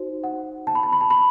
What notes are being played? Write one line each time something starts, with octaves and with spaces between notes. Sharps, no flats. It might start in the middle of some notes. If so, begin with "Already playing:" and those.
Already playing: D#4 F#4 C5
F#5
A5
B5
A5
B5
A5
B5